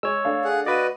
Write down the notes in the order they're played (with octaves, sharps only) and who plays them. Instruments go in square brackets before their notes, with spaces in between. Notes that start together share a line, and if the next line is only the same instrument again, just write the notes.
[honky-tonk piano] G#3 [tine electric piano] C#5 E6
[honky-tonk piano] A3 D4 F5
[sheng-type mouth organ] G#4 F#5
[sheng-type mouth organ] F#4 D#5 [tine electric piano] B4 D5